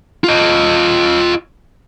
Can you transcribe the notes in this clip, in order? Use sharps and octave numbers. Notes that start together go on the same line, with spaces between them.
F4 D#5